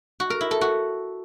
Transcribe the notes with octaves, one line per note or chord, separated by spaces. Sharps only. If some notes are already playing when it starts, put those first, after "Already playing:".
F#4
A#4
E4
A4
F#4